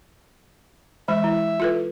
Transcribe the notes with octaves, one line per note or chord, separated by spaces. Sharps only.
E3 G#3 E5
E4
F4 A4 B4